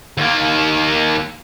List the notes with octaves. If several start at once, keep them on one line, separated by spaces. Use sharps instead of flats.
D#2 A#3